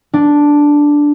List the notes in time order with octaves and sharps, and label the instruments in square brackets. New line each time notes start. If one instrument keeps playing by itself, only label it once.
[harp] D4